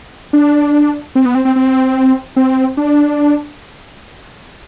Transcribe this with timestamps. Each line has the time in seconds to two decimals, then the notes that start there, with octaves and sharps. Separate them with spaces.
0.33 D4
1.15 C4
1.25 B3
1.35 C4
1.45 C4
1.56 C4
2.36 C4
2.77 D4